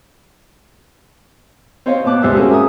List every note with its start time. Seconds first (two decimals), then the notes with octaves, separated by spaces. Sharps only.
1.86 C4 C5 C#5 D#5 F5
2.04 A#2 B3 A5 D6 F#6
2.22 C#2 G3 G#3 C5 E5 E6
2.36 G#3 A#3 C4 C#4 F#4 G#4
2.51 E5 G#5 A#5 D#6